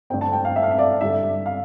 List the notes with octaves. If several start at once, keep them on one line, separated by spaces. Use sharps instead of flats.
G2 D3 A3 C4 G5
A5
G5
F5
E5
F5
E5
D5
G2 D3 G3 D4 E5
F5